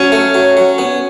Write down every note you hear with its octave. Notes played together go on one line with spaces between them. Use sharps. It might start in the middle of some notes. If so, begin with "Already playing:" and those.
Already playing: F#3 C#4
A3
F#3
F#3
B3